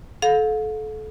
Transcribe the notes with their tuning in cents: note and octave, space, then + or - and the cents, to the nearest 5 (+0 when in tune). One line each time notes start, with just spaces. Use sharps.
A4 -30 F5 +40